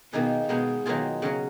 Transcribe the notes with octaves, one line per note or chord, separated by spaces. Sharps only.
B2 D#3 A#3 D#4 G#4 B4
B2 G#3 B3 D#4 G#4
B2 D#3 F#3 A#3 F4 G#4
C#3 F#3 C#4